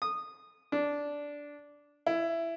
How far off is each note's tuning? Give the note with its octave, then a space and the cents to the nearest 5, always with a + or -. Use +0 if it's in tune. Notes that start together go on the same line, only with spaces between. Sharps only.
D#6 -15
D4 -10
E4 +15